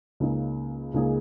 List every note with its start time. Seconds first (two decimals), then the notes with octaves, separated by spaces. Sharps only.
0.20 C#2 C#3 A#3 D#4 G#4
0.94 C#2 C#3 A#3 D#4 G#4